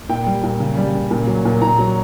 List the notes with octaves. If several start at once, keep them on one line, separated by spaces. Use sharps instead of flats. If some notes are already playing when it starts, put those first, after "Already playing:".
A#2 G5
G3
A#2
C#3
G3
C#3
A#2
F#3
A#2
A#2 A#5
F#3